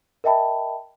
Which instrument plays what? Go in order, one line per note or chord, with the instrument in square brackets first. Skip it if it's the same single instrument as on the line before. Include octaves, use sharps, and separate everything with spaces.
[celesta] A#4 D#5 E5 G5 A5 B5